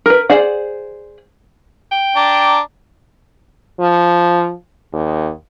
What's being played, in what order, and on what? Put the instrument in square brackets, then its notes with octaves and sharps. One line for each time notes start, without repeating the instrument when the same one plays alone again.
[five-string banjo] A#4 B4
G#4 C5 D5 F#5
[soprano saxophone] G5
[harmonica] D4 A#5 D6
[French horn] F3
D#2